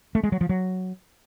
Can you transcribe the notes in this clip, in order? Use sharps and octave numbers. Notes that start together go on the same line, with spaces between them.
A3
G#3
F#3
F3
F#3